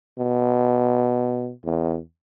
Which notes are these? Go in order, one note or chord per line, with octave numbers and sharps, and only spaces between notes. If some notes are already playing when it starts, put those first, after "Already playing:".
B2
E2